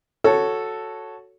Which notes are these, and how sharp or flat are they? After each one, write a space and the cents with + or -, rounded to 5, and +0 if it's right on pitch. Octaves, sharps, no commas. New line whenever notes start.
F#4 +0 A4 +0 C#5 +0